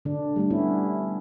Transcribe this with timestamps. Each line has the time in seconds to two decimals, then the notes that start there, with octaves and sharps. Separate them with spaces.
0.05 D3 D4
0.36 G3 A3 D4
0.50 B3 C#4 E4